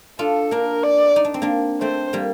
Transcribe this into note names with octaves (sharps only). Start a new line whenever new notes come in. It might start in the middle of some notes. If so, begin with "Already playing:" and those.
D4 F4 A4
A#3 D4 A#4
D5
D#4
D4
C4
A#3 D4
A3 C4 C5
G3 A#3